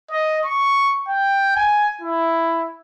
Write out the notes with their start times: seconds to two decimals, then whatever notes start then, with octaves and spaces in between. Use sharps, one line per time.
0.11 D#5
0.45 C#6
1.08 G5
1.56 G#5
2.01 E4